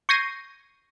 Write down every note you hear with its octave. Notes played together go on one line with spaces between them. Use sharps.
C#6 G6 G#6 A#6 C7 D#7